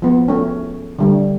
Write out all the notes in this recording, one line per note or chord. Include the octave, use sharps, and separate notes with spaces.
F3 B3
A3 C#4
D3 G3 A3